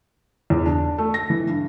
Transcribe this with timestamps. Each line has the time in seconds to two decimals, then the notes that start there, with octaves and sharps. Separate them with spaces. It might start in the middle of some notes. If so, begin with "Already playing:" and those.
0.50 E2
0.65 D4
0.98 A3
1.14 A#6
1.30 E3
1.48 G2